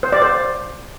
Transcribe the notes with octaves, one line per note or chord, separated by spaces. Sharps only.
C5
D5
C5